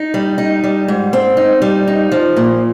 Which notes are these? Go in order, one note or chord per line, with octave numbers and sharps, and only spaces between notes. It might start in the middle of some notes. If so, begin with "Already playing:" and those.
Already playing: D#4
G3
D#4
G3
G#2
C4
D#4
G3
D#4
F3
A#2